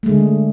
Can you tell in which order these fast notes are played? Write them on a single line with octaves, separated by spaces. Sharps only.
A3 G#3 D3